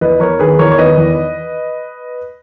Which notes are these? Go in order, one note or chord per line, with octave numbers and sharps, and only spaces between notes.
E2 B4 D#5
E2 A#4 C#5
D#3 G#4 B4
E2 A#4 C#5
C#5
D#3 B4 D#5
E2